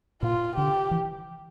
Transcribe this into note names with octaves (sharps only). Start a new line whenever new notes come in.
A#2 F4
D3 G4
E3